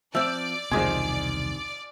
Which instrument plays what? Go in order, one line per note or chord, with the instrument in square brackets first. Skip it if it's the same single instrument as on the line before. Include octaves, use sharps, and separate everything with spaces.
[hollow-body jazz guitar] F3 C4 [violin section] D5 [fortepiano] E5
[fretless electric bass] E1 C2 [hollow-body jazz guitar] C3 D#3 [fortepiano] F3 G#3 G#4